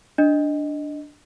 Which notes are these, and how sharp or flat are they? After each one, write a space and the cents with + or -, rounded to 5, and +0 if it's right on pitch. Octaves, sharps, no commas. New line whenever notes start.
D4 +0 D#5 +0